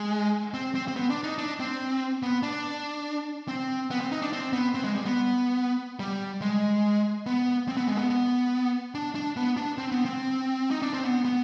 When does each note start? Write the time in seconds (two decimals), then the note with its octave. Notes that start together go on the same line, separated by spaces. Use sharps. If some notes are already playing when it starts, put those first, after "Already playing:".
Already playing: G#3
0.54 C4
0.75 C4
0.88 C4
0.96 B3
1.10 D4
1.23 D#4
1.38 D4
1.60 C4
2.23 B3
2.43 D4
3.48 C4
3.91 B3
4.01 C4
4.12 D#4
4.22 D4
4.33 C4
4.53 B3
4.75 C4
4.84 G#3
4.95 G3
5.05 B3
5.99 G3
6.41 G#3
7.26 B3
7.68 C4
7.77 B3
7.88 G#3
7.97 B3
8.10 B3
8.95 D4
9.15 D4
9.37 B3
9.57 D4
9.78 C4
9.92 B3
10.05 C4
10.71 D#4
10.82 D4
10.93 C4
11.04 B3
11.25 B3